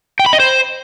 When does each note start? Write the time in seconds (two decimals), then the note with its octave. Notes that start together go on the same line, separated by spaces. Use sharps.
0.19 G5
0.26 B5
0.33 D#5
0.40 C5